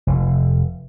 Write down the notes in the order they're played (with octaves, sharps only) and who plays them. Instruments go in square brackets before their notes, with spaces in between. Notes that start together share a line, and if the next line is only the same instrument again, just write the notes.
[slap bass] F1